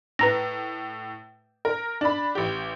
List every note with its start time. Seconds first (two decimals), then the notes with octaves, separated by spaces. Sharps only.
0.19 A2 B4 A#5 A#6
1.65 A#4
2.01 D4 B5
2.35 A1 G4